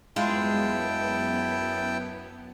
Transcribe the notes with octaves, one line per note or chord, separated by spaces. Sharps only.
F#2 G#3 B3 E4 F4 G5 A5